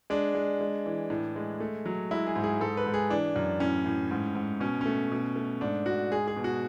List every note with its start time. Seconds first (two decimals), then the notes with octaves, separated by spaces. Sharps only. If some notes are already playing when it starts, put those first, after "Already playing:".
0.10 G#3 D4
0.35 G#3
0.61 G#3
0.86 E3
1.10 A2
1.36 G#3
1.60 A3
1.86 F#3
2.11 G#3 E4
2.27 G#4
2.36 G#2
2.44 G#4
2.61 G#2 A4
2.77 B4
2.86 G#2
2.94 G#4
3.10 E3 D4
3.36 F#2
3.60 A2 C#4
3.86 A2
4.11 G#2
4.35 G#2
4.60 B2 C#4
4.81 A3 C#4
5.12 B2
5.36 A3
5.61 G#2 D4
5.86 G#2 F#4
6.11 G#3 G#4
6.28 G#4
6.37 B2
6.44 F#4